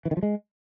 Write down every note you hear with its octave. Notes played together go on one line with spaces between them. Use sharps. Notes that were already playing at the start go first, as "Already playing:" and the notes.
E3
D#3
F3
G#3